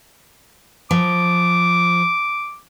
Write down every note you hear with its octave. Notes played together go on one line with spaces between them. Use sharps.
F3 D6